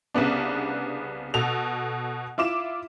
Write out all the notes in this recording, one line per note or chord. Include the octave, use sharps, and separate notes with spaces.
C2 C#3 B3 D4
B2 A4 F7
E4 F4 D6 E7